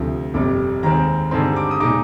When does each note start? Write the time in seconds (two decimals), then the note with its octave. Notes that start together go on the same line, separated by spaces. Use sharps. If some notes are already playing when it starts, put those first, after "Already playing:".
Already playing: D2 C3 F3
0.34 G1 F2 C3 G3 D6
0.83 D#2 D#3 G#3 C4 A#5
1.31 G2 D3 G#3 C4 D#4 C6
1.56 D6
1.71 D#6
1.80 A#2 G#3 D#4 D6